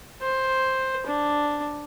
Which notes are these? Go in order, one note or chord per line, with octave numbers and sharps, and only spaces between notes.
C5
D4